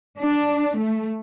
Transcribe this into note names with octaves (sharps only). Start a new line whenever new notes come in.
D4
A3